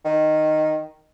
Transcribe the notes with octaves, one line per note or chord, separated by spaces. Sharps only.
D#3